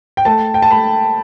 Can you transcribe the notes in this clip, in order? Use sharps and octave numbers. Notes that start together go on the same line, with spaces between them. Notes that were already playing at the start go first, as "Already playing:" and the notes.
G5
A3 A5
G5
A5
A3 B5